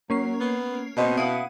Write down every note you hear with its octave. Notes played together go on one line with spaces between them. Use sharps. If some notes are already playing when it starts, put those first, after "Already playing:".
F#3 A#3 C#4 C7
B3
B2 C4 D#4 A#4
E4 F5 F#5 D#6